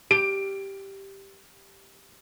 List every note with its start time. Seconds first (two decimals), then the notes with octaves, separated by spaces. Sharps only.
0.11 G4 D7